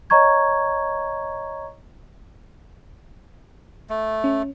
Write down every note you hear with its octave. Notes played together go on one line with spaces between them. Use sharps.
C#5 D#5 A#5 C#6 G#6
A3
C#4